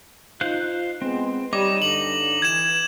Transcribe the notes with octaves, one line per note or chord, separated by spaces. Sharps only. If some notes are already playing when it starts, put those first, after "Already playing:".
D#4 F4 C5 F5 F#6
G#3 B3 C4
G3 D#4 C#5 D#5 D6
G2 D3 F#7
E3 G#6 E7